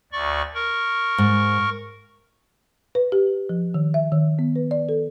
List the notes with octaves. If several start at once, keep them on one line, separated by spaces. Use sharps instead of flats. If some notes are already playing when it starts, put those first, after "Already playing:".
D2 D5 C#6
A#4 C#6
G#2
B4
G4
F3
D#3
E5
D#3
B3
B4
D5
A4